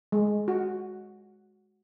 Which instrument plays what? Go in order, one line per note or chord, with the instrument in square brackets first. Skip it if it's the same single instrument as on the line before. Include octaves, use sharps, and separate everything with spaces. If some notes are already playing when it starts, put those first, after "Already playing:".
[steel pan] G#3
F#4